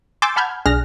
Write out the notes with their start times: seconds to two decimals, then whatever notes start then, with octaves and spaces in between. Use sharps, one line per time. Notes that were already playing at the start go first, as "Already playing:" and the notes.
0.22 G#5 C6 D6 E6 G6 A6
0.36 F#5 A5 B5 F6 G6 G#6
0.66 B1 D4 G#4 F6 F#6 A#6